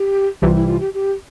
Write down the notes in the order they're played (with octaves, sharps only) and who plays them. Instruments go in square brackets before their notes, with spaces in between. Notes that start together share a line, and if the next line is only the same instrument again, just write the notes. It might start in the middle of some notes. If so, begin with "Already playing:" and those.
Already playing: [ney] G4
[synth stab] C2 C3 E3 G3 [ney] F4
[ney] E4
F4
G4
G4